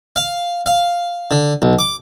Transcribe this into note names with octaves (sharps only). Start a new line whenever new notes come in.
F5
F5
D3
B1
D6